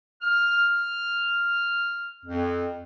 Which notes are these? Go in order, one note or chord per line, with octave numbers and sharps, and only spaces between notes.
F6
F2